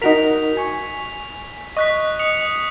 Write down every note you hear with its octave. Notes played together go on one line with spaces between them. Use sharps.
D#4 F#4 A#4 B6 F7
G#5 C#6
D#5 C#6 F#6 B6
D#6 C#7 F7